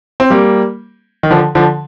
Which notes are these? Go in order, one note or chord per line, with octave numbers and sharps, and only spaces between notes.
C4
G3 A#3
D#3
D3 F3
D3 F3